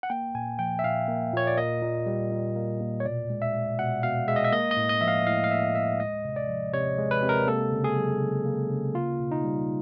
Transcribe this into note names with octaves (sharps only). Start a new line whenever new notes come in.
F#5
A#3 G5
A#2 G#5
F3 G5
E5
A#2 F5
A#3
A#2 C#5
D5
A#3 D#5
A#2
G3
A#2
A#3
A#2
C#5
B2 D5
G#3
E5
G#3
B2 F#5
B2 F5
G#3 E5
D#5
E5
A#3 D#5
D#5
A2
D#5
F3 E5
F5
A2 F5
F5
A#3 E5
A2 E5
G#3 D#5
C3
D5
F3
C3 C#5
G#3
B4
C3
A#4
A#3 A4
C#3
G#4
F#3
C#3
A#3
C#3
A#3 F4
B2
D#4
G3